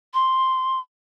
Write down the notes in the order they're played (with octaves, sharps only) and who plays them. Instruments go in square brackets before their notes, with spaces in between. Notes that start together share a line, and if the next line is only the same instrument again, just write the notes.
[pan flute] C6